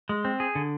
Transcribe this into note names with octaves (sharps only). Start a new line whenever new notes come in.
G#3
C4
G#4
D3